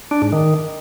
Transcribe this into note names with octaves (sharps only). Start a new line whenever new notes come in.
D4
G#2
D#3